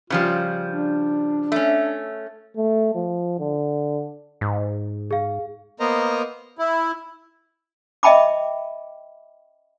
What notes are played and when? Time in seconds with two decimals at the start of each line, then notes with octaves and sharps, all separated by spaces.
0.10 C#3 F3 G3 F4
0.69 D4
1.52 A3 C#4
2.57 A3
2.95 F3
3.39 D3
4.41 G#2
5.11 G#4 F5
5.80 A#3 B3 A#4 C5 D#5 A#5
6.58 E4
8.03 D#5 E5 G5 A5 B5 D6